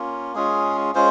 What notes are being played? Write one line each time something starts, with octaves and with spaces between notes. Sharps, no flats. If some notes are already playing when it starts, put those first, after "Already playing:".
Already playing: A#3 C#4 F4
G#3 C#4 F4 G#4
G#3 C#4 F4 C5